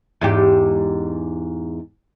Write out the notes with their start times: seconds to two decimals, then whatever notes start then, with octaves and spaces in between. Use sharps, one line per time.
0.21 E2 G#2 G4